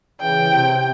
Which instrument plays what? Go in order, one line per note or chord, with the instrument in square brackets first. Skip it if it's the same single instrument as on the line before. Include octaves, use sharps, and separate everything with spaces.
[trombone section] C#3 E3 [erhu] G5
[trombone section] C3